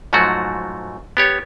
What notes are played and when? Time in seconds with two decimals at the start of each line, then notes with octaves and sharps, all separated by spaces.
0.13 G#2 F3 F#3 A3 F#4
1.17 B3 G4 C#5